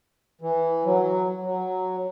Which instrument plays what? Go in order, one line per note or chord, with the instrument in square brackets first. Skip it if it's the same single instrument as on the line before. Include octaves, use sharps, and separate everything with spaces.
[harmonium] E3
F#3
F#3